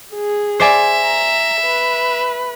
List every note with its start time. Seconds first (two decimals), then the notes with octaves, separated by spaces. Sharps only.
0.15 G#4
0.60 C5 D5 E5 G#5
1.00 A#5
1.62 B4